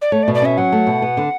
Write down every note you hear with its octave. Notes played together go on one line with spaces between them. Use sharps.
D5
A3 C#5
D5
B2
D5
C#4 E5
F#3 F#5
A3
B2
B3
D3